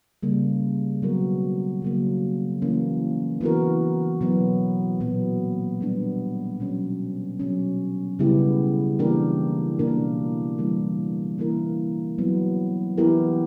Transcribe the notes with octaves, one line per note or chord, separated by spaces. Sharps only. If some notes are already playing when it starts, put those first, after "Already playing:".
C#3 G3 A#3
B2 F#3 B3 F#4 A#4
C#3 F#3 A#3
E3 A#3 C#4
E3 B3 F#4 A#4
B2 F#3 B3
A#2 F#3 B3
G3 B3 D4
B2 F#3 C#4
B2 F#3 C#4
C#3 G3 B3 E4 G4
E3 A#3 D4 G4 A#4
B2 A#3 D4 A#4
E3 G3 A#3
E3 A#3 E4 A#4
F#3 B3 E4
E3 B3 E4 G4 A#4